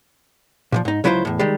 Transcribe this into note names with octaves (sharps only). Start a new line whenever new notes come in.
A#2 D3 F3
G#2 D#4
C#2 F#3 E4 F4 B4 C5
E2 A2
D#3 G3 G#3